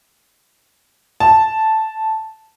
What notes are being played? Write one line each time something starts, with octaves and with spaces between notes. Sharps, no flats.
A5